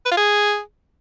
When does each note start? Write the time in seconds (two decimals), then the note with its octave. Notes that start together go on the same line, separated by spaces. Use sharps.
0.06 B4
0.11 F4
0.17 G#4